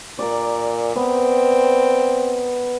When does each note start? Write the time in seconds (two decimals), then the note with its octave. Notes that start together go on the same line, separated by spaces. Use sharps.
0.19 A#2 A#4 D5
0.96 B3 C4